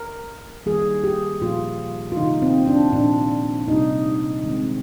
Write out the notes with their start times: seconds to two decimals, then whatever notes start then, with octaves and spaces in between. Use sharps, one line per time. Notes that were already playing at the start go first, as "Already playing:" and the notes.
Already playing: A#4
0.66 D#3 G3 A#3 G#4
1.04 G4
1.41 A#2 F3 A#3 F4
2.12 F4
2.17 C3 D#3 A#3 D#4
2.42 C4
2.68 D4
2.92 A#2 F3 A#3 D4
3.68 C3 G3 A#3 D#4
4.44 D#3 G#3 C4